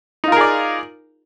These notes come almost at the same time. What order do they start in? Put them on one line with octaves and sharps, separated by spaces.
D#4 F4 A#4 G#4 D5